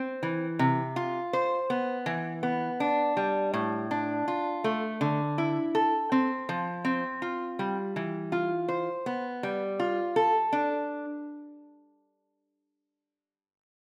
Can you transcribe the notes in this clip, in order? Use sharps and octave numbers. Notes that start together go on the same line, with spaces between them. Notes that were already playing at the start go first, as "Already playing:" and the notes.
Already playing: C4
E3
C3
F4
C5
B3
E3
B3
D4
G3
A2
D4
F4
A3
D3
E4
A4
C4
F3
C4
F4
G3
E3
F4
C5
B3
G3
F4
A4
D4